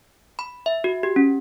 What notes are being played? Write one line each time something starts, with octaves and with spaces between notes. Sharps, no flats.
B5
E5
F#4
G4
C#4